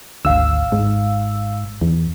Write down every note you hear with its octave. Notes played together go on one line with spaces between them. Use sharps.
G#1 D2 F5 E6
G#2
E2